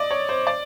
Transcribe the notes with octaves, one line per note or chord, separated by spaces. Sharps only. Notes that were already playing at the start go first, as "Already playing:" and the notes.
Already playing: D5 D#5
C#5
C5
D5